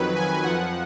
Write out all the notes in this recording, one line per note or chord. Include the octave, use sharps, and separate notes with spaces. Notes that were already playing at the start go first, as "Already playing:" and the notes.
Already playing: F2 D#3 F#3 B4
G#5
F2 F3 F#5